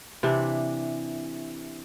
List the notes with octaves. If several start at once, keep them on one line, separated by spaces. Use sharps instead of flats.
C3 E3 D4